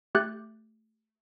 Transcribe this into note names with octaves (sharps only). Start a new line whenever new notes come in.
A3 G4 F#6 G6 A6